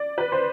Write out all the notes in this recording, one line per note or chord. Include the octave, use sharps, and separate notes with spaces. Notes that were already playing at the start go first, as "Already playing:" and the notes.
Already playing: D5
B4
C5